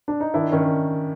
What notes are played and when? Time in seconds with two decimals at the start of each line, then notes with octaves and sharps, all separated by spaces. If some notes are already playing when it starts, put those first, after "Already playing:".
0.08 D4
0.20 D#4
0.34 D#3 D4 E4
0.52 D#3 C#4